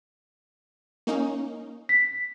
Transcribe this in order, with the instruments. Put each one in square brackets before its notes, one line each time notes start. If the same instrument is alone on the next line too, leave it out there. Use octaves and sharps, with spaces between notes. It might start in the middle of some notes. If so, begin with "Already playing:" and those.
[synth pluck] A#3 C#4 D#4
[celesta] B6